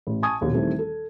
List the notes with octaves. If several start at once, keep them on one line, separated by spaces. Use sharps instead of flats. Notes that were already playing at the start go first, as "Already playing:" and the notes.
A1
G#5 A5 C#6 D#6 G#6
A#1 D#2 B2
D#3 E3 G3 A3 C4
A4